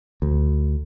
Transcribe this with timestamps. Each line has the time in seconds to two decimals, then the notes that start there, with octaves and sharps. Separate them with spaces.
0.22 D2